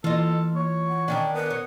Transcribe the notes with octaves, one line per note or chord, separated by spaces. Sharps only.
E3 A#3 F4 A4 D#5
A#3 C#5
F#5
D#3 C#4 D4 G5
B3 A#4
C#5